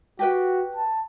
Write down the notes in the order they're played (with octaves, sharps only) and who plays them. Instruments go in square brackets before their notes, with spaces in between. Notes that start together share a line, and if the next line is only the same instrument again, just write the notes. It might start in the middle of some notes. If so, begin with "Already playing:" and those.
[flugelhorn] F#4 [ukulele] G4 B4 G5
[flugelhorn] A5